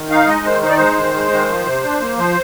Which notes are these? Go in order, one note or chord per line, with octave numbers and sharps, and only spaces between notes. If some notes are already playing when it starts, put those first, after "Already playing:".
Already playing: D#3
D#4 F5
G#3 D#5
D#3 C5
D#4 C5
D5
G#3 C5
D#3
G#3
D#3
F3
C3
D4
A#3
F3 C5